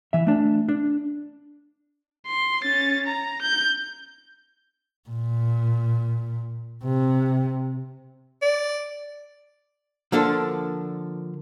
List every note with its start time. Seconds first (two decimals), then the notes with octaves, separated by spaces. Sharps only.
0.13 E3 E5
0.27 A3 D4
0.69 D4
2.27 C6
2.63 C#4 A6
3.07 A#5
3.42 G6
5.09 A#2
6.84 C3
8.42 D5
10.12 D3 F3 A#3 D4 A4